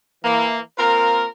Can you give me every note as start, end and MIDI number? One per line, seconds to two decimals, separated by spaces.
0.23 0.60 52
0.23 0.60 58
0.79 1.26 58
0.79 1.26 60
0.79 1.26 65
0.79 1.26 70